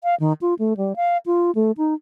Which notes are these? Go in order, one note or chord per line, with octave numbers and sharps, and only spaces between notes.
F5
D#3
F4
A3
G3
F5
F4
A3
D#4